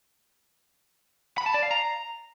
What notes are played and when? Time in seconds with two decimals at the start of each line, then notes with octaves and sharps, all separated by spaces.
1.38 B5
1.46 A5
1.54 D5
1.63 F5
1.71 A#5